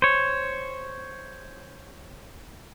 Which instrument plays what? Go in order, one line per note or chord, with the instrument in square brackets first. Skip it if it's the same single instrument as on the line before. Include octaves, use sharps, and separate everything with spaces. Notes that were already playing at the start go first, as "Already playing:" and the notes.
[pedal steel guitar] C5 C#5